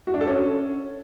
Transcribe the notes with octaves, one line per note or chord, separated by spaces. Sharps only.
F#4
D4
A4
C#4